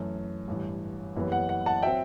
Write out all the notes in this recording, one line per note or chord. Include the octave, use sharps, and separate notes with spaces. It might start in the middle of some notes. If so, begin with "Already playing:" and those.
Already playing: F#2 E3 A3
A1 G2 E3
F#1 F#2 E3 G3 B3
F#5
F#5
F#5 A5
F#3 C4 E5 G5